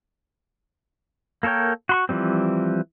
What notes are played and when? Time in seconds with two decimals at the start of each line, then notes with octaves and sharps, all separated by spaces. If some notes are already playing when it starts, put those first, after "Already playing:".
1.43 A#3 A4 A#4 C#5 G5
1.89 F#4 C6 C#6
2.09 E3 F3 G3 C4